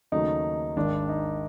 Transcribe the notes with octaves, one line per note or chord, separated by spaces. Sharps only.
D#2 C#3 F#3 A3 D#4
G#1 G#2 D#3 D4
D#4